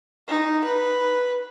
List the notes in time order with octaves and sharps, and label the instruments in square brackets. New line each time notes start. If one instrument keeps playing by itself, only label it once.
[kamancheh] D#4
B4